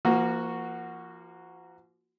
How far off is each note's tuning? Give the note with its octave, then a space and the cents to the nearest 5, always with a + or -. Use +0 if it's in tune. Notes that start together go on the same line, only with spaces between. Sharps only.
F3 -35 A#3 +0 F#4 +0